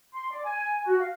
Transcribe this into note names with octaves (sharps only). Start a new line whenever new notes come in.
C6
D5
G#5
F#4
F5